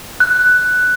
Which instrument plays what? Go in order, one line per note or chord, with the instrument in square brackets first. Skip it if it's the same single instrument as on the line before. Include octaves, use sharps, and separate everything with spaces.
[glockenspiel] F#6